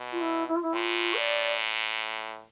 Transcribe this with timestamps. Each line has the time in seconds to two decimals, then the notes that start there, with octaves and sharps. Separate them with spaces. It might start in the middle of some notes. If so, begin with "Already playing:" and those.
Already playing: B2
0.11 F4
0.20 E4
0.47 E4
0.55 F4
0.62 E4
0.73 A2 F4
1.14 D5